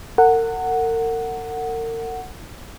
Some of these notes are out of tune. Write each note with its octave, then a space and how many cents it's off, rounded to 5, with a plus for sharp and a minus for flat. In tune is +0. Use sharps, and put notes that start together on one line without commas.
A#4 -40 F#5 +0